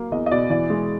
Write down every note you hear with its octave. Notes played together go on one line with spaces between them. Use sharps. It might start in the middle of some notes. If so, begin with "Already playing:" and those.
Already playing: F#3 A#3 F5
E2 D#5
D#5
B2 D5
E3 D5
G#3